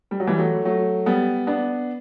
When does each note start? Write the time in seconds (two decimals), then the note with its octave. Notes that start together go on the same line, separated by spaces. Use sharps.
0.11 G3
0.20 F#3
0.27 E3 G3
0.38 F#3 A3
0.65 F#3 A3
1.06 G3 B3
1.47 B3 D4